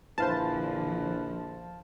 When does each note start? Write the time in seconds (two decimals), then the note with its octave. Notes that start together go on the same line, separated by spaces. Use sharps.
0.18 A#1 D3 E3 F3 B4 C5 F5 A5